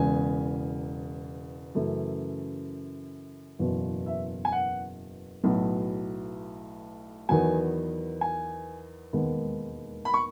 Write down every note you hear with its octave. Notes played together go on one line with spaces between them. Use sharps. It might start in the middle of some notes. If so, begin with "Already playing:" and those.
Already playing: E1 E2 C#3 G#5
F#2 C#3 E3 A3
F#1 E2 B2
E5
G#5
F#5
B1 A2 F#3 B3
E2 D#3 F#3 B3 G#5
G#5
E1 D#2 D#3 G#3 B3
B5
C#6